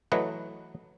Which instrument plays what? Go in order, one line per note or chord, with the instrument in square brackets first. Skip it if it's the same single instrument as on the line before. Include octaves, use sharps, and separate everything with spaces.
[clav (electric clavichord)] E3 F#3 A3 B4 D#5